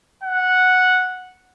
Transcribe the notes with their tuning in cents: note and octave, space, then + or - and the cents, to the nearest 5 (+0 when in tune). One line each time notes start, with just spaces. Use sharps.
F#5 -5